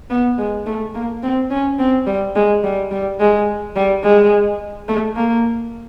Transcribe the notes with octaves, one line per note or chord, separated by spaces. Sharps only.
B3
G#3
A3
A#3
C4
C#4
C4
G3
G#3
G3
G3
G#3
G3
G#3
A3
A#3